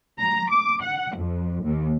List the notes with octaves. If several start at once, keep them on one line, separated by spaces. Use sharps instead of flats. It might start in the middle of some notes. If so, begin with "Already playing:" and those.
A#5
D6
F#5
F2
D#2